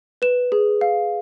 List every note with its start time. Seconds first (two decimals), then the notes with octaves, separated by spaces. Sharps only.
0.22 B4 E7
0.52 G#4
0.81 F5